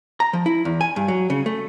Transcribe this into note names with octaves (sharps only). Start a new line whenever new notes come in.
A#5
F3
E4
E2
G#5
G2
F#3
C#3
A3